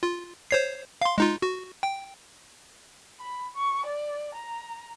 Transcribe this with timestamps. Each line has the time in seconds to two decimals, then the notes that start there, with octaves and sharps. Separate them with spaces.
0.03 F4
0.51 C5 C#5 C7
1.02 F5 C6
1.18 G#3 D#4 F4
1.42 F#4
1.83 G5
3.20 B5
3.55 C#6
3.86 D5
4.35 A#5